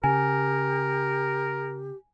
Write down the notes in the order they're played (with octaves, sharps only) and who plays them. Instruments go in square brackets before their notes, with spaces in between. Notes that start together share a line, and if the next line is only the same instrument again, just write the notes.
[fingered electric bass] C#3 [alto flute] G4 [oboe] A#4 [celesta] G#5